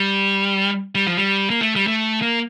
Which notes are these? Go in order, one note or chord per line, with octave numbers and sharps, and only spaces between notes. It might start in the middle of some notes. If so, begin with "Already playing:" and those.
Already playing: G3
G3
F3
G3
A#3
A3
G3
A3
A#3